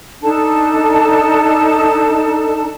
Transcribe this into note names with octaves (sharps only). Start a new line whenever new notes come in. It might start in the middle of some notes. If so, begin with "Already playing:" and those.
D4 D#4 A4 A5